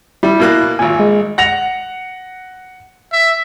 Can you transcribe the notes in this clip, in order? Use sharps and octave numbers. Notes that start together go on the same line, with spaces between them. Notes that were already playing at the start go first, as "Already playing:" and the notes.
G3 E4
B2 A#3 F#6
G#1 A#2 G#5
G#3
F#5 A#6 F7
E5